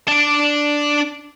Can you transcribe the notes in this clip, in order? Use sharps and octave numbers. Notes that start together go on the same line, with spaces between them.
D4 D5